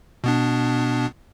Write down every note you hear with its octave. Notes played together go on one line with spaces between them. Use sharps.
B2 B3 D4